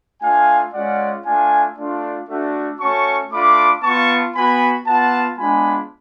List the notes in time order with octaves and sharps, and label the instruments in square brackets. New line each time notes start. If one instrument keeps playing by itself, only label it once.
[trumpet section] A3 D4 F4 F5 G#5
G#3 C#4 F4 D5 F#5
A3 D4 F4 F5 G#5
A3 D4 F4
A3 D4 F#4
A3 C#4 F#4 A5 C#6
A3 D4 F4 B5 D6
B3 F4 A5 C#6
B3 F#4 G#5 B5
B3 F4 F#5 A5
G#3 B3 D4 F4 G#5 B5